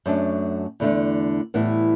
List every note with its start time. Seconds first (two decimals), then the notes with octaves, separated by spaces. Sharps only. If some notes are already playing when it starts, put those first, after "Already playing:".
0.06 F#2 F#3 A3 D4
0.80 E2 D3 A3 D4
1.54 A2 E3 G3 B3 E4